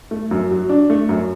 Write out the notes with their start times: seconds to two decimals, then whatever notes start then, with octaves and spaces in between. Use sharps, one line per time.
0.11 A3
0.31 F#2
0.51 F#3
0.69 D4
0.90 A3
1.09 F#2